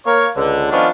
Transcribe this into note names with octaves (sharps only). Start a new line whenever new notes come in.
A#3 A#4 C#5
C#2 D3
D#3 F3 B3 C#4 D4 F4